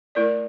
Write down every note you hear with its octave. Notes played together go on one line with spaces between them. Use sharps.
A3 E4 A#4 D5